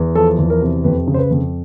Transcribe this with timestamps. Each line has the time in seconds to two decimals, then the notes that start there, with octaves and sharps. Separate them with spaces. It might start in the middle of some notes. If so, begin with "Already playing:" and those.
Already playing: E2
0.15 F3 A4
0.38 E2
0.50 A#4
0.61 C3
0.84 F2 B4
1.08 C#3
1.14 C5
1.19 B4
1.31 F2